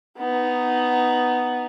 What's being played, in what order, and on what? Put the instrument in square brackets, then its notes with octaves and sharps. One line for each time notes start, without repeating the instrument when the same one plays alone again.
[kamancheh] B3 D#4